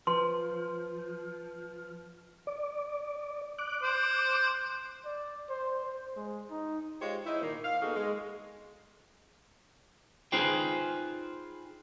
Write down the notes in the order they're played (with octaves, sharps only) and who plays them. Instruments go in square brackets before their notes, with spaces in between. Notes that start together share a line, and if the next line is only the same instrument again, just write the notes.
[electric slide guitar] F3 [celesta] B4 [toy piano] C6
[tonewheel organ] D5
D6 F#6
[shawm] C5
[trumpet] D5
C5
C5
G#3
D#4
[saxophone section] G#3 F4 G4 C5 C#5
D#4 E4 C5
A#2 D#3 A#3
F5
A#3 B3 D#4 F#4 G#4 A4
G#3
[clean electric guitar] D#4 F4 G#4 B4 C5 G5